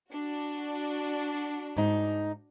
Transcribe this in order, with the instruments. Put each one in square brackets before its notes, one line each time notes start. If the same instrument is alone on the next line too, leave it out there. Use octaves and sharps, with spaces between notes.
[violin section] D4 F#4
[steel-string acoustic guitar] G#2 D#4